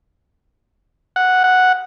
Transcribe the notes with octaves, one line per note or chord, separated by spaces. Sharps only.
F#5
F#5